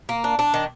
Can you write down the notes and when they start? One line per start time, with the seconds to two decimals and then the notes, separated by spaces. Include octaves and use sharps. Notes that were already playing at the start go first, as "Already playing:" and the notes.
0.09 A#3
0.24 D4
0.39 D4
0.54 D#3